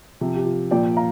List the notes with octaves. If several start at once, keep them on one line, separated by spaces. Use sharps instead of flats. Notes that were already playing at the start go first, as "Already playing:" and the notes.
C3 F3
G4
F4
A#2 F3 D5 G5
F5 A#5